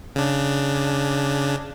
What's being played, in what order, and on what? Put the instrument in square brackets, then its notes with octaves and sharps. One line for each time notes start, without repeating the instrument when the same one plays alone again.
[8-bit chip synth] C#3 D4